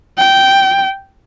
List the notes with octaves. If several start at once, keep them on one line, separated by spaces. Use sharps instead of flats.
G5